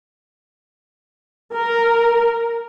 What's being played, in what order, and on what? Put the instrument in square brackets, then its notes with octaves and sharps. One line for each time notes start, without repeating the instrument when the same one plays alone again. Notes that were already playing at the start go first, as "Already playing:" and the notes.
[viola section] A#4